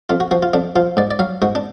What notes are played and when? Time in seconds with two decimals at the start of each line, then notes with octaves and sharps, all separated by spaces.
0.09 F2 F4
0.20 F#4
0.31 F3 F#4
0.43 F4
0.53 F2 D4
0.76 F3 F4
0.97 G#2 D5
1.11 D5
1.19 F#3 F5
1.42 G#2 F#4
1.55 D4